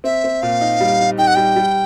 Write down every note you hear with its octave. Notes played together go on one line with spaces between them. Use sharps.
C4 E5
C4
A#2 F5
D#4
G3
D#4
D#4 G5
F#5
G3 G5
G3